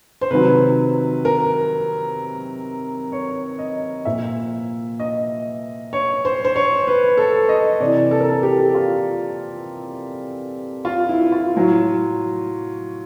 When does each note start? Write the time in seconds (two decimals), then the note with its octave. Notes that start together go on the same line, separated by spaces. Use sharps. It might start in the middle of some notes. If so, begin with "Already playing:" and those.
0.21 C5
0.30 C3 D#3 F#3 B4
1.25 A#4
3.12 C#5
3.59 D#5
4.05 A#2 F3 E5
5.00 D#5
5.93 C#5
6.25 C5
6.45 C5
6.56 C#5
6.87 B4
7.17 A4
7.49 D#5
7.80 C3 E3 D5
8.11 A4
8.20 A#4
8.29 A4
8.43 G4
8.75 F4
10.85 F4
11.09 E4
11.32 F4
11.55 A2 F#3